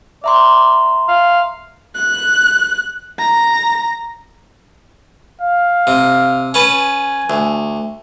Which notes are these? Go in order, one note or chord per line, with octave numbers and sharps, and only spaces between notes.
D5 E5 A#5 C6
F5
F#6
A#5
F5
C3
C#4 B4 G#5 A5
D2